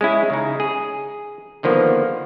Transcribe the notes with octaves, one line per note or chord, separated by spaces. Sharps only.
G#3 C#4 E4
C#3 D#4
G#4
D3 D#3 F3 A#3 B3